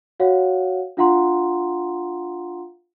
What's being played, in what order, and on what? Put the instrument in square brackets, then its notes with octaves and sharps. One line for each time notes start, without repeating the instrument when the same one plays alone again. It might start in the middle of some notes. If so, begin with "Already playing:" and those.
[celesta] F#4 C#5 F5 F#5
D4 F4 F5 F#5 A#5 C6